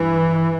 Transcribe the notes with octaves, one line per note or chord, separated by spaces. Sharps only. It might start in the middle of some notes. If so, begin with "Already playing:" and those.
Already playing: G2 E3